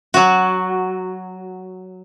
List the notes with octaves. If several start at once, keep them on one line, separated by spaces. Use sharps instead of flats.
F#3 F#4